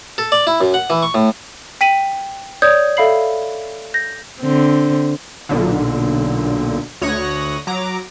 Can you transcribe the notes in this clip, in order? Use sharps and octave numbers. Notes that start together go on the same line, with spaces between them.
A4
D5
E4
F#2
F#5
E3
C#6
A2
G5 B6 D#7 F#7
C#5 D5 D#6 G6 G#6
A4 E5 F5 B5 C7 F#7
G6 A#6
D3 C4
B1 A#2 D3
D2 C#5 D#6 F#6 A#6
F#3 A#5 D6